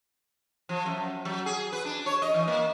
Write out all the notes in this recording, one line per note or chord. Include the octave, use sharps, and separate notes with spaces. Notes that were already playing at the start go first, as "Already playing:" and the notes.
F3
F#2
F#3
G#4
B4
D4
C#5
D#5
E3
A#3